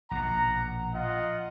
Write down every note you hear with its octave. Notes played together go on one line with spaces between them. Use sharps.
A#1 B2 F#5 A#5
F4 D#5 F#5